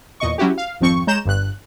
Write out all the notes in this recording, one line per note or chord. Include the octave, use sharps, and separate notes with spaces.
E2 A#2 D#5 C#6
F#3 C#4 E4 F#4 G4
F5
G#1 F2 F3 C4 C#6
G#3 C#5 A#5 G6 E7
G1 G2 F#6